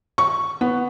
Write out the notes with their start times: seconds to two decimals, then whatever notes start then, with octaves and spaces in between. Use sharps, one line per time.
0.18 C#6
0.61 B3